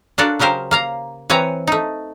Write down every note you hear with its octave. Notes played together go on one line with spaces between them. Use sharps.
D4 F4 F#4 A4 A#4 D5
C#3 F#3 G4 A#4 C5
A#3 F5 A#5
E3 C4 B4 C#5 G#5 A#5
A3 D#4